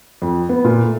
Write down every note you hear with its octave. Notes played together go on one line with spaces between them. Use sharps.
F2
B3
A#2
A3